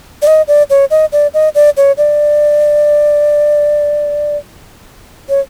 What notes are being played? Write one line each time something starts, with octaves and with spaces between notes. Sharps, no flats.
D5
D#5
D5
C#5
D#5
D5
D#5
D5
C#5
D5
C#5